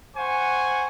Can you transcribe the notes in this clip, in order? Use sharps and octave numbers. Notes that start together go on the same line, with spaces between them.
C5 F#5 G#5 C#6